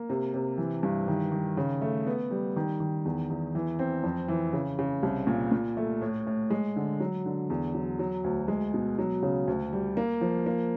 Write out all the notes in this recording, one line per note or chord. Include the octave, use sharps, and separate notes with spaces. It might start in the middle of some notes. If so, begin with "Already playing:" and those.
Already playing: A#3
C3
C3
E3
G2
D#3
D#3
C#3
A3
B3
G3
D#3
D#3
E2
E2
E3
C4
F2
E3
C#3
C#3
C2
A#2
A#2
A3
A2
A2
G#3
D3
F#3
D3
E2
F#3
F#3
D2
G#3
B2
F#3
C#3
D2
G3
A#3
F3
A#3